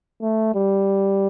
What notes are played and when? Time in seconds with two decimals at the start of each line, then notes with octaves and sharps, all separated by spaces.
0.22 A3
0.55 G3